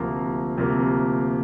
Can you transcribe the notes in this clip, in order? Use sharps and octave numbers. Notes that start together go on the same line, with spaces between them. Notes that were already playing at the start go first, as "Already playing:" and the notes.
Already playing: D2 C3 F3 A#3
D2 C3 F3 A#3